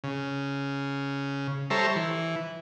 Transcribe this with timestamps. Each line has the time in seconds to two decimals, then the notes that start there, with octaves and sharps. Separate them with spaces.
0.04 C#3
1.70 G3 A4 C5 C#5 E5 A#5
1.96 E3